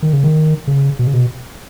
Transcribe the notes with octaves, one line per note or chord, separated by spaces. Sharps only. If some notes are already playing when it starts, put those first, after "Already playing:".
D#3
C#3
D#3
C#3
B2
C#3
B2